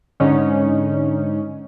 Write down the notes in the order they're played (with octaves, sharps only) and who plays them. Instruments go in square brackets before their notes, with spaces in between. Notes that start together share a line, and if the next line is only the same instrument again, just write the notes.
[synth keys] G#2 D3 C#4 D#4